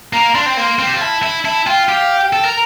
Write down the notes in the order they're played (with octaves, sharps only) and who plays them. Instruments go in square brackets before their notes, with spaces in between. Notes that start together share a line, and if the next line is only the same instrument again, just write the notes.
[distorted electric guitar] A#3 [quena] A#5
[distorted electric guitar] D4 [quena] C6
[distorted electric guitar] C4
[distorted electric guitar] A#3 [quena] C6
[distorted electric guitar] C4
G4
F4
[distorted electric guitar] E4 [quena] A5
[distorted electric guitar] E4
[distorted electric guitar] E4 [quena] A5
[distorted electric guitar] F4 [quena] G5
[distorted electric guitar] G4 [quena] F5
[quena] G5
[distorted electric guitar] A4
[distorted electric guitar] A#4 [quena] A#5